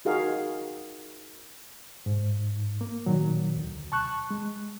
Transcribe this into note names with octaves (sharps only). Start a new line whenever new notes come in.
D#4 F4 F#4 G#4 A#4 F5
G#2
A#3
A#2 D#3 F#3
D2
A5 C#6 F#6
G#3